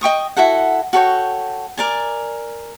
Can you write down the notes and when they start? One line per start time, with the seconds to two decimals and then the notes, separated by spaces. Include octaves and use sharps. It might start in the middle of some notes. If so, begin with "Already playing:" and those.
0.01 D#5 G5 C#6 D#6
0.37 E4 F#4 A4 F#5
0.93 F#4 A4 C#5 G5
1.77 A#4 D5 G#5